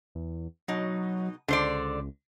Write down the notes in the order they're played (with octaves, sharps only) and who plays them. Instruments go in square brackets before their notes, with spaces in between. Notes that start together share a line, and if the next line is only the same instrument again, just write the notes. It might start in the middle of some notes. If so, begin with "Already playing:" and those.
[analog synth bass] E2
[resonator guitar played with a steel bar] B2 D#4 [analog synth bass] F#3
[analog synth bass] C#2 [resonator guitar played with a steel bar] D3 C5 D5